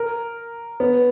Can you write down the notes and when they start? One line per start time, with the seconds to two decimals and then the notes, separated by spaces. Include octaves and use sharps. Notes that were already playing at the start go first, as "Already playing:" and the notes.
Already playing: A#4
0.80 B3